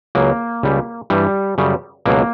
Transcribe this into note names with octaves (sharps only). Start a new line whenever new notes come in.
C#2 C#3 F#3 A#3
C#2 C#3 G3
G2 E3 G3
F#2 C#3 G3
C#2 B2 F#3 A#3